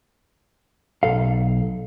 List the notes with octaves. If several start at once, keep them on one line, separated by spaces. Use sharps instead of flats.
B1 A4 F5